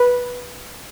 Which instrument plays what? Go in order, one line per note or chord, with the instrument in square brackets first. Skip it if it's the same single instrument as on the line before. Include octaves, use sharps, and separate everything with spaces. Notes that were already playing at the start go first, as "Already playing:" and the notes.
Already playing: [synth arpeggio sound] B4